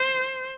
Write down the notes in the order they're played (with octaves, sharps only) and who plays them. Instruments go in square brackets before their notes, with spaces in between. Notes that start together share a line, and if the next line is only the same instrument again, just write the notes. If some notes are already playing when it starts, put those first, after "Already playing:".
Already playing: [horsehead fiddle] C5